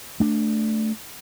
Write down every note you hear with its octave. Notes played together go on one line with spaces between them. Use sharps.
A3 D4